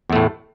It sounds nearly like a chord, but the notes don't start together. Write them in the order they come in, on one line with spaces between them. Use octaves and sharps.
E2 A3 A2